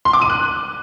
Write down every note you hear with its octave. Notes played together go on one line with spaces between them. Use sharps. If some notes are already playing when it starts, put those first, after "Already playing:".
C6
D6
D#7
F#6